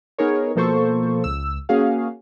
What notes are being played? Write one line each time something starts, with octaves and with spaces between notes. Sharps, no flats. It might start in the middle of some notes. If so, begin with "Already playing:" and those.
B3 D#4 G#4 A#4 C#5
B2 F3 A#3 A4 C5 C#6
C#2 E6
A#3 C#4 F#4 G#4 F5